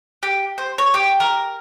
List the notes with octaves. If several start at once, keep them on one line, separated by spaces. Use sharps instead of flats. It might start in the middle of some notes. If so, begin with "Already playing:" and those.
G4
C5
C#5
G4
A#4